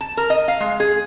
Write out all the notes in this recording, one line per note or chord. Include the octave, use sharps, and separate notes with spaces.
A5
A#4
D#5
F5
G#3
G#4